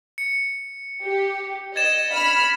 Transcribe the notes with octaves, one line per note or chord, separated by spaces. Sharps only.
C#7
G4
D#5 G#6 A6 E7
B5 F6